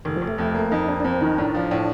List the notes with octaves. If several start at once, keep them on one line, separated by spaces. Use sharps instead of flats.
F1 D#3
F1 F3
A3
F2
A#3
F2 D#4
A#3 D4
D4
F2 C4
D#3 D#4
A2 D4
F3
A2